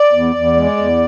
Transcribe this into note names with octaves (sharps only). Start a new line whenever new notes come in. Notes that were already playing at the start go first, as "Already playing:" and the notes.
Already playing: D5
E2
E2
G#3
E2